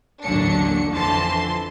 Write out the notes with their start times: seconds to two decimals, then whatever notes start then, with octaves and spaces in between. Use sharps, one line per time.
0.24 A1 D#2 D3 F#3 D4 C#7
0.92 F2 D3 E3 A5 C6